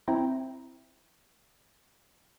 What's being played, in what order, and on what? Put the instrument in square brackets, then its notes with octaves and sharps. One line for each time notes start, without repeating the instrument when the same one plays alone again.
[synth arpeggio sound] C4 E4 G5 A#5